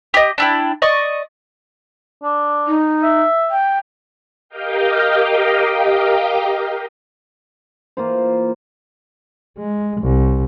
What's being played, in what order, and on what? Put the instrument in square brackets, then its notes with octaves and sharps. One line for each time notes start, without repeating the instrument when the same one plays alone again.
[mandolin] G4 D#5
D4 E4 G5
D5 D#5 C#6
[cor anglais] D4
[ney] D#4
[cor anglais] E5
[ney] G5
[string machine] G4 A#4 D#5 F5 G5
[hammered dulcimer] E3 A#3 F4 C5
[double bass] G#3
C2